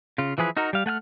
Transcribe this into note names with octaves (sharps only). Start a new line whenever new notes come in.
C#3 F4
E3 F3 G#4 B4
D#4 F#4 A#4
G3 F5
A3 F#5 G#5 F6